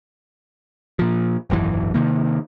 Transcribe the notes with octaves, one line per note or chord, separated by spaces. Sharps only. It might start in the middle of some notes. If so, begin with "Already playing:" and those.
A#2 F3
D#1 G#1 F#2 E3
C3 D#3 A#3